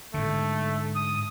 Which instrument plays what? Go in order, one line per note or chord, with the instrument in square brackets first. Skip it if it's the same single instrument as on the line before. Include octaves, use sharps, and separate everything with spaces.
[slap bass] G#2 D3 [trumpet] A3
[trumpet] D#6